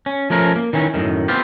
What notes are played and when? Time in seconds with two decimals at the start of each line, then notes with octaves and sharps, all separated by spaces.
0.06 C#4
0.30 F3 A3 C#4 A#4
0.56 A#3
0.73 D#3 E3 C#4
0.94 F#2 A2 D#3
1.28 B3 C4 F4 G4